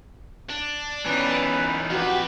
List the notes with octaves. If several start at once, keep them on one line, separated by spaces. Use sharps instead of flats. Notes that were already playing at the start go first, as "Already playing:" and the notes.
D4
E3 B3 C#4 D#4 B4
F2 F#4 G4 B4